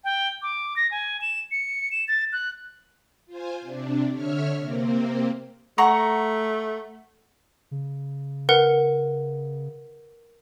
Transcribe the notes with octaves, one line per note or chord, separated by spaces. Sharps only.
G5
D6
A#6
G#5
E7
C#7
E7
A6
F#6
F4 C5 G#5
C3 D4
D3 C#5 E5 F6
C3 A#3 C4
A3 F#5 A#5 C#6
C#3
A#4 B4 F#5